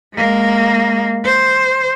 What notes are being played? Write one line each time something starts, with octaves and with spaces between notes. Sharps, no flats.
G#3 A#3
C5